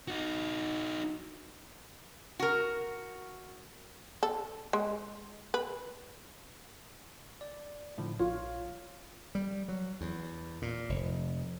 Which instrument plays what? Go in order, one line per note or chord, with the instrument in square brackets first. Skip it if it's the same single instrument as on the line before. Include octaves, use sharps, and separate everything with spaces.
[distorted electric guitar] D#4 F#4
[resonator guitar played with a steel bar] F#4 A#4
[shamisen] A4
G#3
B4
[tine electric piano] D5
A2 D3 F3
[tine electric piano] A#1 C#5 [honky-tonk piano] F4
[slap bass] G3
F#3
E2
A#2
F1